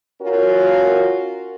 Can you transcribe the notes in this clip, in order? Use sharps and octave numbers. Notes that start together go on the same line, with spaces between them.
C#4 F4 F#4 A#4